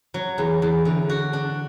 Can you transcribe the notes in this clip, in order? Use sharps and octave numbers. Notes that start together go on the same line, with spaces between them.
F#3
E2
E2
D3
F#4
D4